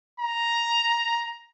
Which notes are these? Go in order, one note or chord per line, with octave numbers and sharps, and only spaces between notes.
A#5